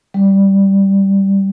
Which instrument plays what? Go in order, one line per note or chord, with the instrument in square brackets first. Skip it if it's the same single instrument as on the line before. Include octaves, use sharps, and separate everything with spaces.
[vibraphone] G3